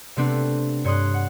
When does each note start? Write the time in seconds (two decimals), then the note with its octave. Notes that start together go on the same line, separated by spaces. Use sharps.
0.16 C3 A3 B3 C4 D4 B4
0.84 G2 C#5 C6 D#6 F#6
1.14 F#5